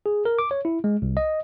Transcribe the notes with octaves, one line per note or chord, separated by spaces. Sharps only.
G#4
A#4
D6
C#5
E4
G#3
C2
D#5